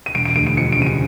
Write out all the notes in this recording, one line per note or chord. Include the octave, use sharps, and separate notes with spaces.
D#7
E1 D7
D7
D2 D7
D7
F3 C#7
D7
C#3 D#7
D7